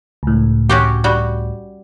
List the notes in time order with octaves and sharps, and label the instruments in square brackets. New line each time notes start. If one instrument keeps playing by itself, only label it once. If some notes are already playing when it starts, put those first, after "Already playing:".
[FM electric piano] C#2 A2
[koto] C#4 F#4 G4
G3 F#4